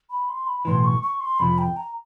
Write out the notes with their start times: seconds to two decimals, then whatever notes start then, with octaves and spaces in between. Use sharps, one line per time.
0.10 B5
0.29 C6
0.47 B5
0.65 B1 A2 E3 C6
0.84 C#6
1.03 C#6
1.20 C6
1.39 F2 C3 F3 B5
1.58 G5
1.77 A#5